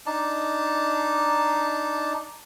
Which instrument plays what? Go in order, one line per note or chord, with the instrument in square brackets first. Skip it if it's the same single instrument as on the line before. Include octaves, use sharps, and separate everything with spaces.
[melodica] D4 D#4 A5